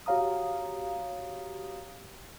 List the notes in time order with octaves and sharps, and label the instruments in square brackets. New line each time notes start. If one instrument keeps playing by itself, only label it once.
[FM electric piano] F#4 G4 C#5 F5 A#5 D#6